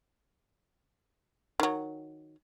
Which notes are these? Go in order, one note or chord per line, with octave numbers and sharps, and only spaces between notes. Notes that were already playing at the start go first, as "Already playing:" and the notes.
D#3 F#3